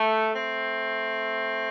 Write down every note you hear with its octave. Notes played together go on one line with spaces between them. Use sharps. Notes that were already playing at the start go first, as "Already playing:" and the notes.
Already playing: A3
A3 C4